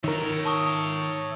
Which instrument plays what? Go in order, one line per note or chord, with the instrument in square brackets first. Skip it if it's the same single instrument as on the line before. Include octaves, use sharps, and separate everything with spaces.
[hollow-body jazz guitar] D#3 A#4 [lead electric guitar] C#5 E5
[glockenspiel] A5 C#6 D#6